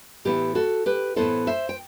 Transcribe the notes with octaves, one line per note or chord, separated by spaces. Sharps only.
A2 E3 B3 E4 G4
F#4 A4
G4 B4
A2 E3 B3 E4 A4 C5
C5 E5
G5